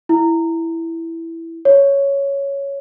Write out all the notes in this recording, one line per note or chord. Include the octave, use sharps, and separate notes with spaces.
E4
C#5